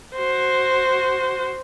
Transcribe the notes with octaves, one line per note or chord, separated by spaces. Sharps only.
F#4 C5